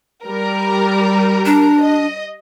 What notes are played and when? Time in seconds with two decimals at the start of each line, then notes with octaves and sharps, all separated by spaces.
0.25 G3 A#4
1.46 D4
1.82 D#5